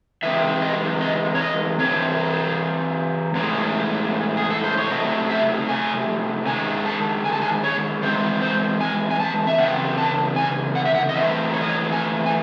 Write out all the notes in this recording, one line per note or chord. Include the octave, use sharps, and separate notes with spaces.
E3 G#3 C4 E5
D#5
D#5
C#5
D#5
E3 C4 C#5
A2 E3 G#3 C#4
G#4
A4
C5
C#5
C3 F#3 A3 C#4 D#5
E5
G#5
D#3 G#3 C#4 G#5
A5
G#5
A5
G#5
C#5
E3 G#3 C4 C5
C5
G#5
G#5
A5
E5
C#3 E3 C4 F#5
A5
G#5
F#5
E5
F#5
D#5
A2 E3 C4 E5
C#5
D#5
C#5
G#5
G#5